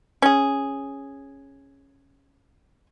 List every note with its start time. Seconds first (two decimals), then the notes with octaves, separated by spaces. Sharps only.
0.22 C#4 G#4